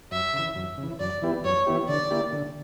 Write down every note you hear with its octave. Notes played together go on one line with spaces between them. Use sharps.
F#2 E5
C#3
E3
F#2
C#3
E3
F#2 D5
E3 B3 E4 G4
F#2 C#5
E3 B3 E4 G4
D3 D5
A#3 E4 G4
D3